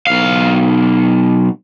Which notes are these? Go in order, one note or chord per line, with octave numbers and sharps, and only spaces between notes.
B1 F5